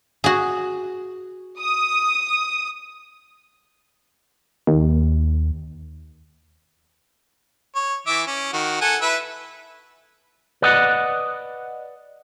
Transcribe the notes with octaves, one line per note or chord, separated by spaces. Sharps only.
F#4 G#4
D#6
D#2
C#5
E3 E5 D6
C#4
D#3 F#4
A4 F#5 G#5
E4 B4 E5
B4 D5 D#5 F#5